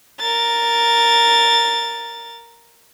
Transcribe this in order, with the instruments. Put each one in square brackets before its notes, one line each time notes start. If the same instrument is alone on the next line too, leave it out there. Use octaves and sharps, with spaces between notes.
[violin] A#4 A6